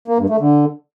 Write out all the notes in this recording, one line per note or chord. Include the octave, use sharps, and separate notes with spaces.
A#3
G2
A3
D3